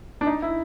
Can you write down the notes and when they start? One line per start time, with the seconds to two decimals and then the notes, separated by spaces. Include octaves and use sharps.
0.21 D4
0.27 D#4
0.42 E4